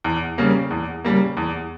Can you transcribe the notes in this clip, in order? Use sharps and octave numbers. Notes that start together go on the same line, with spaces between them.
E2
C#3 G3 A#3
E2
C#3 G3 A#3
E2